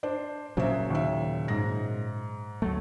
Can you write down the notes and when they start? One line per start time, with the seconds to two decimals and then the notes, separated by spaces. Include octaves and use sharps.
0.03 D4 C5
0.57 A#2 C#3 F#3 C5 E5
0.90 D#2 E5
1.48 G#2 A#6
2.62 D2 F#3 A3